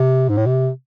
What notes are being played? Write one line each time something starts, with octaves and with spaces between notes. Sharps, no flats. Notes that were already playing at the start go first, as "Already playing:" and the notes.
Already playing: C3
G#2
A2
C3